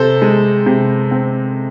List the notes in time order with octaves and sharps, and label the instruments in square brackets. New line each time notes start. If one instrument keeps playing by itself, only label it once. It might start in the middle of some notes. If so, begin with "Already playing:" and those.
Already playing: [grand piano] C3 A4 C5
G#3
C3
C4